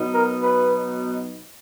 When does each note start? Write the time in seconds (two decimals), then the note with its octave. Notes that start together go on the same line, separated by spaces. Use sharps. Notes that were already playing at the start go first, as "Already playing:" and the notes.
Already playing: B2 F#3 B3 D#4
0.13 A#4
0.43 B4